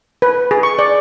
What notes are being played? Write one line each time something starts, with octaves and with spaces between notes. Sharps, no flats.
B4
G#4
C#6
D5